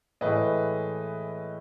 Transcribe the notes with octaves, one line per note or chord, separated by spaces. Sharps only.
A2 E3 G#3 B4 D#5